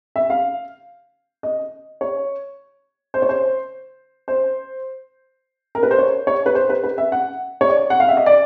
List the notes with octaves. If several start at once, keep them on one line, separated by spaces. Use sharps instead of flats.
E5
F5
D#5
C#5
C5
C#5
C5
C5
A#4
B4
C5
C#5
C#5
B4
C5
B4
B4
E5
F#5
C#5
D5
F#5
F5
E5
D#5
D5